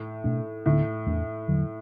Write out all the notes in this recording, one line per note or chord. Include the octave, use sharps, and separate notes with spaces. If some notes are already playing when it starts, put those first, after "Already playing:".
Already playing: A2
B2 A3 D4
D2 A2 D3 B3 D4
E2 E3 A3 D4
E2 D3 F#3